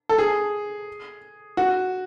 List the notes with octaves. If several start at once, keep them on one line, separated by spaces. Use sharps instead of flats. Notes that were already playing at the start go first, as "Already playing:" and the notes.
A4
G#4
F#4